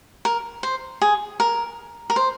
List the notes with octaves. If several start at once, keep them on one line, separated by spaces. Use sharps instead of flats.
A#4
C5
G#4
A#4
A#4
C5